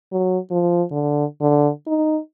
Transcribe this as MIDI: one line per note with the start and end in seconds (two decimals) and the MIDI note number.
0.12 0.38 54
0.51 0.83 53
0.91 1.25 50
1.41 1.70 50
1.87 2.19 63